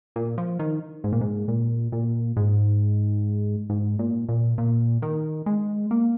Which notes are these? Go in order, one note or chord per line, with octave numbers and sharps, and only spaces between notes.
A#2
F3
D#3
G#2
A#2
G#2
A#2
A#2
G#2
G#2
A#2
A#2
A#2
D#3
G#3
A#3